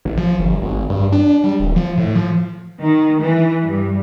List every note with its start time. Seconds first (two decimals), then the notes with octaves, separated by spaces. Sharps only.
0.05 A1
0.17 F3
0.39 G1
0.62 G#1
0.90 G2
1.12 D4
1.44 G3
1.60 D1
1.76 F3
1.97 A2
2.15 F3
2.80 D#3
3.21 E3
3.65 G2